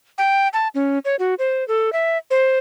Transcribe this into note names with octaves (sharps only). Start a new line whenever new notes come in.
G5
A5
C#4
C#5
F#4
C5
A4
E5
C5